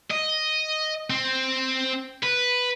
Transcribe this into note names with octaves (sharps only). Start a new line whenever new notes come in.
D#5
C4
B4